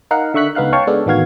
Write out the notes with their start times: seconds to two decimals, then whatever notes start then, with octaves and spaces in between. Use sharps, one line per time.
0.11 D#4 A#4 F5 F#5
0.34 D3 E5 C#6 F#6 B6
0.55 C#2 B3 D#4 F5 F#6
0.73 C#5 F5 G5 A5 C#6
0.87 G#3 B3 D4 A4
1.06 A1 D#3 B3 F#4 F5 G#6